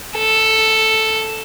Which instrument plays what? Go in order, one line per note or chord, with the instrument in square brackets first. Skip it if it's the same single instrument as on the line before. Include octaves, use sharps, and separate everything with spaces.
[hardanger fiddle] A4